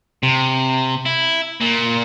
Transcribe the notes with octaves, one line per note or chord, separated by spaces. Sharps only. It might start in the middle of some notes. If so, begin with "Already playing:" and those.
C3
E4
A#2